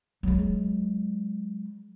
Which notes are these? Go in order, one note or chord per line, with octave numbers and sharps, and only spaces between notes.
F#3 G#3